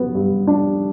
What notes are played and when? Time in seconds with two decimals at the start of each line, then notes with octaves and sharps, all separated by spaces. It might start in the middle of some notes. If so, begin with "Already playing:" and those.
Already playing: F#3 B3
0.15 G2
0.47 D4